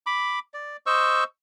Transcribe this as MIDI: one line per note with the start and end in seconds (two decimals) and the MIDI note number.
0.06 0.39 83
0.06 0.39 86
0.54 0.77 74
0.86 1.24 72
0.86 1.24 75
0.86 1.24 85
0.86 1.24 88